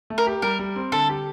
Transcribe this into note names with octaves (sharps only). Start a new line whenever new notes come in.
A3
A#4
G4
G3 A#4
G3
C4
D3 A4
G4